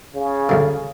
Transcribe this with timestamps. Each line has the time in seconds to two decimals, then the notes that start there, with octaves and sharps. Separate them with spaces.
0.15 C#3
0.49 C#2 F#2 D3